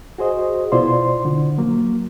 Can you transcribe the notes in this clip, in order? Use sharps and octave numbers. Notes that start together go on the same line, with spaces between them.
F#4 G#4 C5 D#5
B2 E4 F4 C5 D5 C6
D3
F#3 A#3